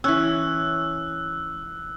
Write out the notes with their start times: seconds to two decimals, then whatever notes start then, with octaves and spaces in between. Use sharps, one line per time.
0.04 E3 C#4 E6 F#6